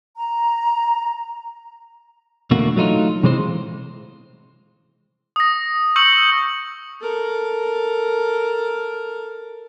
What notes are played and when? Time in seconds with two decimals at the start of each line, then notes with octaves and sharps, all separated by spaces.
0.15 A#5
2.51 E2 B2 D3 A3 A#3 F#4
2.76 F#3 A3 D#4 F4
3.23 C3 E3 G#3 C4 C5
5.36 D#6 A#6
5.96 C#6 E6 G6 C#7 F#7
7.02 A4 A#4